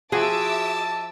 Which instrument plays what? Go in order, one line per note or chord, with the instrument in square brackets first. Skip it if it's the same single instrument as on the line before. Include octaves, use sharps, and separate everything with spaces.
[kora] F3 [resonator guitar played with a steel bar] F#4 G#4 [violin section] E5 D6 E6 [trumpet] A5